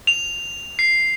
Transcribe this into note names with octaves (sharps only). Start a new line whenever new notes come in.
F7
C7